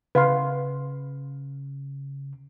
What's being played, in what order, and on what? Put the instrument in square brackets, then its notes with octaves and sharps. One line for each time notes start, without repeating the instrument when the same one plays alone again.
[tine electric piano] C#3 [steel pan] B4 F5 C6